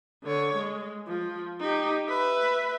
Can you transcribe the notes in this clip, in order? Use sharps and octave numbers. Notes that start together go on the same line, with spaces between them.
D3 C#5
G#3
F3
D#4 G4
B4 E5